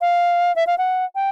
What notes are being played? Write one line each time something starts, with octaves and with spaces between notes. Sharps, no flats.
F5
E5
F5
F#5
G5